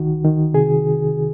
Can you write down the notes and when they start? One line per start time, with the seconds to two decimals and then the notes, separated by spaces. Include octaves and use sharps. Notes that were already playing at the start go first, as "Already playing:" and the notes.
Already playing: C2 D#3 F#4
0.25 D#3
0.54 C3 G#4